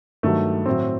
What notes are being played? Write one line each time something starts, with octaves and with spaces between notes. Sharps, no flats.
G2 D#3 F#3 A3
A2 F#3 C4